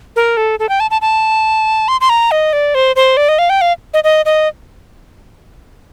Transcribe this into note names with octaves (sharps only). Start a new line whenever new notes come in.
A#4
A4
A4
G5
A5
A5
A5
C6
C6
A#5
D#5
D5
C5
C5
D5
D#5
F5
G5
F5
D#5
D#5
D#5